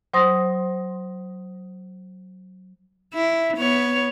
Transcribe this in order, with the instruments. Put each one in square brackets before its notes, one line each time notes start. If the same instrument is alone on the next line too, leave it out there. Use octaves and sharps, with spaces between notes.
[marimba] F#3 C5 C6 D#6 A#6
[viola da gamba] E4
B3 C#5